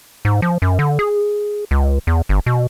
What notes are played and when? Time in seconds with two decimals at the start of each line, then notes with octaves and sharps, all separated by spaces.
0.25 G#2
0.42 F3
0.62 F#2
0.79 D3
0.99 G#4
1.71 C#2
2.07 E2
2.29 G1
2.46 B2